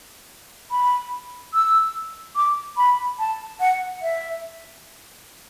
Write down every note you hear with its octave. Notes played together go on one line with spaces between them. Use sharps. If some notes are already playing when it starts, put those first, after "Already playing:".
B5
E6
D6
B5
A5
F#5
E5